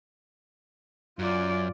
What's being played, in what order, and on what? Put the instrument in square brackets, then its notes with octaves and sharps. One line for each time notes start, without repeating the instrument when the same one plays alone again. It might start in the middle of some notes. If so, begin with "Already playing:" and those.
[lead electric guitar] F#2 [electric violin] F4 D5